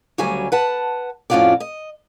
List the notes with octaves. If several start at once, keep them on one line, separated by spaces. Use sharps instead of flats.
D2 C#3 F#3 G3 G#5
B4 F#5 A5
F2 A2 C#4 F4 F#4 D5
D#5